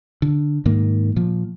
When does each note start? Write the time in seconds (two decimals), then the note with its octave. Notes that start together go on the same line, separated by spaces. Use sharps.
0.22 D3
0.66 G#2 D#3 A#3
1.16 A#2 F3